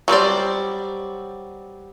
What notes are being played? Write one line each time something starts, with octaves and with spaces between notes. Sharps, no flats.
F#3 G3 C4 D5